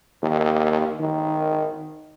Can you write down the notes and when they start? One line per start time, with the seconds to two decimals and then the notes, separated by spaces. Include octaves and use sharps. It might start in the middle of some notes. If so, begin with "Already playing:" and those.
0.23 D#2
1.00 D#3